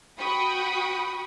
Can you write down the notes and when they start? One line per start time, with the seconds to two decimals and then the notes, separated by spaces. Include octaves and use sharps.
0.19 F#4 G5 B5 C#6 D#6